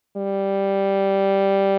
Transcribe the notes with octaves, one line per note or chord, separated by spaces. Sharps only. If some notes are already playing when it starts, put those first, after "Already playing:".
G3